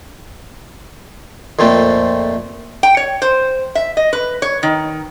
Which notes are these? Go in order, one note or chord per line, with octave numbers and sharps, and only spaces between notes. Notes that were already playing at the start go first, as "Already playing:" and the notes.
F2 A#2 A3 C4
G5
C#5
C5
E5
D#5
B4
C#5
D#3